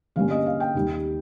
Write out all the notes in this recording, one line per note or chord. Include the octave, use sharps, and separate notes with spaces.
G1 G2 G3 A#3 C#4 F5
D#5
F5
G5
D#2 D#3 G3